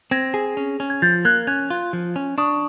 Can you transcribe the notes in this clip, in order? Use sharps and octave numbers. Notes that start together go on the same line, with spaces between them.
C4 G#6 A#6
G#4
C#4
C#4
G#6
F3 G6 A6
A#3 F#6 G#6
C#4 F#6 G#6
F4
F3
C#4
D4 C#6 D#6